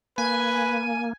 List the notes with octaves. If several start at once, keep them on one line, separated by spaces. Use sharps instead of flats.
A#3 B4 G#5